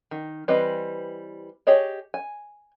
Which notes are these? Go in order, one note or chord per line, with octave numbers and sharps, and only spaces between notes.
D#3
E3 G3 C4 B4 D#5
G4 G#4 C#5 D#5
G#5